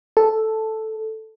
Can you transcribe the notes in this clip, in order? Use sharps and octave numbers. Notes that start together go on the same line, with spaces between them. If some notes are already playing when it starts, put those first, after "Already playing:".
A4